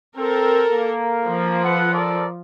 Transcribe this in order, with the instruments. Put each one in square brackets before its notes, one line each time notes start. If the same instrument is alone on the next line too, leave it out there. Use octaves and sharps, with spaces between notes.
[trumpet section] C4 [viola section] A4 A#4
[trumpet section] A#3
[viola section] F3
[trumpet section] A4 B4 F#5
A4 A#4 D5